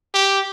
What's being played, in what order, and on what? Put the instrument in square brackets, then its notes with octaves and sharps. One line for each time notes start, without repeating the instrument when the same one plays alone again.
[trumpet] G4